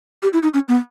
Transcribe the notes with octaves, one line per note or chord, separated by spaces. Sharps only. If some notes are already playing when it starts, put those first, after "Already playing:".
G4
E4
D#4
C#4
B3